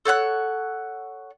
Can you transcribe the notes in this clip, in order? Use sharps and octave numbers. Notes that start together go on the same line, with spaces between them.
A4 C#5 F#5 F#6